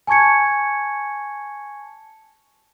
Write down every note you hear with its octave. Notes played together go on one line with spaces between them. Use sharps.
G#5 A5 C#6 G#6 C#7